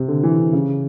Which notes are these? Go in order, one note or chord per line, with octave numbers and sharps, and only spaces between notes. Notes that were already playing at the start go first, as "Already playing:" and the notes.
Already playing: C3
D3
E3
D3
C#3